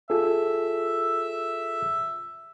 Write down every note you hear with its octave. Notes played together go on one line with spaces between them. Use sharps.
F4 G#4 A4 E5